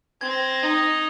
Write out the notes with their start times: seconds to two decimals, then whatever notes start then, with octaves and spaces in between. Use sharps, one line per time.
0.21 C4 G#6
0.31 A#6
0.40 G#6
0.50 A#6
0.59 D#4 G#6